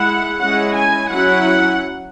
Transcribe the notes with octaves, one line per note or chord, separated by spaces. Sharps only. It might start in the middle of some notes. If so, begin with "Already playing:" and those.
Already playing: G#3 E4 F#5
G#3 C#4 E4 F#5
G#5
F#3 C#4 E4 F#5